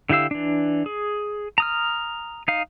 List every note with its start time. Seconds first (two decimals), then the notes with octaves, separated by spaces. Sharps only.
0.09 D3 E4 G4 F5 E6
0.31 E3 D4
0.86 G#4
1.58 A#5 D#6 F6
2.48 D#4 F5